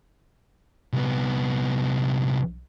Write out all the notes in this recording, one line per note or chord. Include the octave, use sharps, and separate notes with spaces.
C2 B3